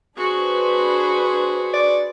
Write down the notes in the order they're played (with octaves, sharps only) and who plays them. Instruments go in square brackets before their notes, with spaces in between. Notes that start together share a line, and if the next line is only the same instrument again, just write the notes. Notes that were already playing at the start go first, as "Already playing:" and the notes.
[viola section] D4 B4 C5 [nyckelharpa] F#4 G#4
[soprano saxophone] D5